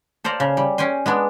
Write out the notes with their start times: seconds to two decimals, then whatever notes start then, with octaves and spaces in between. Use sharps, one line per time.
0.24 A4 C5 D5 F5 A#5
0.40 C#3
0.57 G3
0.78 C#4 G5 G#5 C6
1.06 G#3 B3 D4